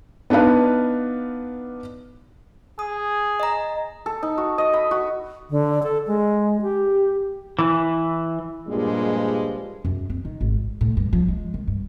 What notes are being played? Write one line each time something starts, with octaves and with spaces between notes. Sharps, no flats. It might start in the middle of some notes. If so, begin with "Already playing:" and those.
B3 D4 D#4 B4 F5
G#4 D#6
D#5 A#5
A4
D#4
F#4
D#5
B5
F#4
D3
A4
G#3
G4
E3
G2 A#2 F3 G3 G#3
F#2
C4
D#3
G#1
A1
A2
G2
F3
G#3
D#3
G2